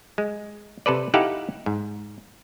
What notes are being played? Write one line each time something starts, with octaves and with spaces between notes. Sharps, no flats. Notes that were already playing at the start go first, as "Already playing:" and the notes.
G#3
C3 A4 B4 D5
D#4 E4 G4 A4 F5 F#5
G#2